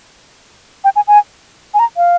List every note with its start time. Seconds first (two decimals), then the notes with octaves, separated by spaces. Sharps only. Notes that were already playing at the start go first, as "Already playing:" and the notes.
0.84 G5
0.96 G#5
1.08 G#5
1.74 G#5
1.79 A#5
1.97 F5